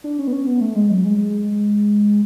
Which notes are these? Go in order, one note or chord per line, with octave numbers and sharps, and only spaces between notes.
D4
C#4
B3
C#4
B3
A3
G#3
F#3
G#3